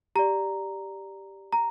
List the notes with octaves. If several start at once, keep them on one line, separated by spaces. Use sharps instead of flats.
G4 D5 A#5
A#5